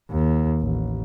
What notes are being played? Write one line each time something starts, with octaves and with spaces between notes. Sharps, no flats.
D#2
A1